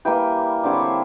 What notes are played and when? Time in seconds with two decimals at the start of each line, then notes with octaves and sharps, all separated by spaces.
0.05 E3 G3 A#3 G5
0.63 D3 G3 C4 E4 D5
0.73 C#5
0.83 C5